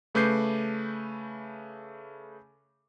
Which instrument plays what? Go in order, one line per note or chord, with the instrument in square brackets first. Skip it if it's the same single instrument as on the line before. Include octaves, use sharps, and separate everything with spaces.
[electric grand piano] C#3 A3 B4 D6 G6 C7